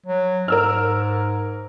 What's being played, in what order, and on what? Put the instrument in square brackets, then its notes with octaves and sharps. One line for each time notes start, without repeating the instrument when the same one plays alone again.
[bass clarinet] F#3
[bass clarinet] G#2 [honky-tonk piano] A#4 E6 F6